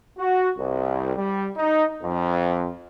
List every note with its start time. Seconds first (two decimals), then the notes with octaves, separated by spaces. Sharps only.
0.18 F#4
0.57 C2
1.16 G3
1.56 D#4
2.03 F2